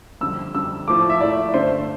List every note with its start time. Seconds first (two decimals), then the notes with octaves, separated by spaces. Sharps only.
0.21 F2 D3 G3 E6
0.54 F2 D3 G3 E6
0.88 A2 F3 A3 D6
1.10 E5
1.20 A2 F3 A3 D5
1.54 G2 D3 A3 C5